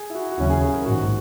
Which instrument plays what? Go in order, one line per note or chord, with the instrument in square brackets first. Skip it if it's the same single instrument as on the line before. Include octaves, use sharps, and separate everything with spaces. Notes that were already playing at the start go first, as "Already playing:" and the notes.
Already playing: [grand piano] G#4
E4
F#4
F#4
[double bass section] D#2 C#3 F#3 C#4 [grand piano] E4
[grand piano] G#4
G#4
A#4
[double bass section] A#1 G#2 D#3 [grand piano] F#4